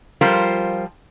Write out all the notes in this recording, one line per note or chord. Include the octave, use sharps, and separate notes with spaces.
F3 G3 F4 A#4 C5